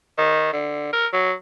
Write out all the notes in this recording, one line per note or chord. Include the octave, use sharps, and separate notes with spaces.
D#3
D3
A#4
F#3